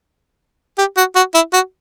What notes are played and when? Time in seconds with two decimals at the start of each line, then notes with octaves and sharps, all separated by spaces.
0.78 G4
0.97 F#4
1.16 F#4
1.34 E4
1.54 F#4